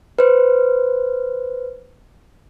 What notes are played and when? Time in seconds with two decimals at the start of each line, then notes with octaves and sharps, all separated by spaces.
0.19 B4 C5